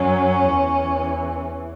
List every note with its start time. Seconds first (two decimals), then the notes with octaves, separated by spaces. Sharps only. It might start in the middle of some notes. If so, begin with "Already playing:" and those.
Already playing: F#2 F#3 C#4
0.49 E2 E3